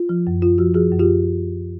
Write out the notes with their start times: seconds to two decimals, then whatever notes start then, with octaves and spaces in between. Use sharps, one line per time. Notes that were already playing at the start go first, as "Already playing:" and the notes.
Already playing: F4
0.09 F3
0.27 F#2
0.42 F#2 F4
0.58 F3 F#4
0.74 F3 F#4 G#4
0.91 F#2
0.99 F4 G4